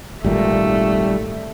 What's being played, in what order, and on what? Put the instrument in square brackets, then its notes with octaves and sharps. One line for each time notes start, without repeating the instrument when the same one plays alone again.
[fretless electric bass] G#1 A#2 [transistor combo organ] G3 [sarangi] A3